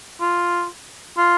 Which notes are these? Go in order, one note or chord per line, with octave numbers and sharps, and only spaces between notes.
F4
F4